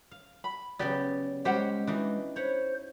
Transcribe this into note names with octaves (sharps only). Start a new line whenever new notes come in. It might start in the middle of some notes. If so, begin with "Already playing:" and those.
F5
B5
C#3 F#3 B3 G4 D5
G3 G#3 C#4 G4 C5 F#5
E3 D4 D#4 F#4
C5 C#5 F#5 B5